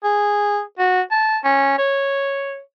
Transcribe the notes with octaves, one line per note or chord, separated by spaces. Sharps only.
G#4
F#4
A5
C#4
C#5